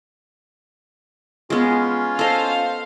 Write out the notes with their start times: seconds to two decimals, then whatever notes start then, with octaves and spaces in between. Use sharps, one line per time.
1.50 G#3 B3 C#4 F4
2.19 A4 C5 D#5 F5